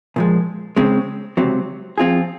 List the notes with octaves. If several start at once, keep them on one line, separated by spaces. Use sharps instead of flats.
A#2 F3 G#3
C#3 G#3 C4
C#2 C3 F#3 C4
F3 C4 F4 G#4